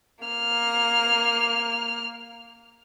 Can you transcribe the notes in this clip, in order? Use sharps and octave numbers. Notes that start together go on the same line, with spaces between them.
A#3 F6